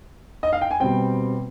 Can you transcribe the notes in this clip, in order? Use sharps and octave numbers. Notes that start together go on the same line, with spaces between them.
D#5
F5
G5
G#5
B2 G3 C4 G5